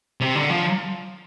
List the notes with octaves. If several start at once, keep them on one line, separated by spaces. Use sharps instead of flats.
C3
D3
F3